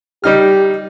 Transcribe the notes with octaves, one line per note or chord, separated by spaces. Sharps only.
G3 D#4 G4 F6